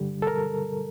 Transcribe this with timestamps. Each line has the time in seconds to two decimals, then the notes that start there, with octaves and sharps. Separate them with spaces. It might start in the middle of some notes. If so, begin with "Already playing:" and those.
Already playing: G2 D3 G3
0.22 A4
0.27 A#4